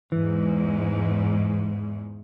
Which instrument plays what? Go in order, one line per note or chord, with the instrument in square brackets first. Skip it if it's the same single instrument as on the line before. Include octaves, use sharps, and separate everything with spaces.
[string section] E2 G#2 [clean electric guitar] E3